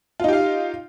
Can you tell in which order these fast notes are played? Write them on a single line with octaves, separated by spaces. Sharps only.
F4 D#4 G4 F5